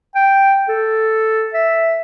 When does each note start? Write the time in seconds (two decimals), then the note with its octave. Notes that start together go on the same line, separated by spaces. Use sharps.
0.15 G5
0.69 A4
1.54 E5